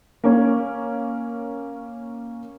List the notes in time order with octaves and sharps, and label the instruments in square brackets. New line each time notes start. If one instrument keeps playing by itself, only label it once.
[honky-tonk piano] A#3 C#4